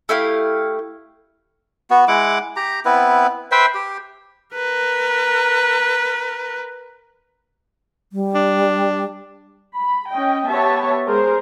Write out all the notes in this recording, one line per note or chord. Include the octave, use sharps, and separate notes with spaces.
A3 E4 G4 F5
B3 F#4
G#3 E4 F#5 D6
G4 A#5
B3 C4 E4 B4
B4 C5 E5 G5
G4
A#4 B4
G3
D4
B5
C#4 D#5 G5
B3 G4 C#5 E5 A5
G#3 G#4 A#4 C5